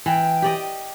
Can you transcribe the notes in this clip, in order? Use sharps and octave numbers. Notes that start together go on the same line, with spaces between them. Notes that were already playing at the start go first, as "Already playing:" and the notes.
E3 G5
G4 D5 D#5